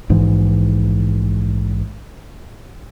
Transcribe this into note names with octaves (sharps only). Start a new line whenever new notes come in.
A#1 G#2 E3